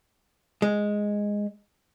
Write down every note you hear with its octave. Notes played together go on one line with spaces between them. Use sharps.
G#3